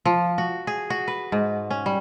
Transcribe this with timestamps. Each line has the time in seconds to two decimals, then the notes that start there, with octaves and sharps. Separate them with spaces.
0.05 F3
0.38 F#4
0.67 G#4
0.90 F#4
1.08 B4
1.32 G#2
1.71 C#4
1.86 G3